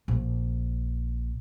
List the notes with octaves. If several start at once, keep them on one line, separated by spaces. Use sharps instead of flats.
A#1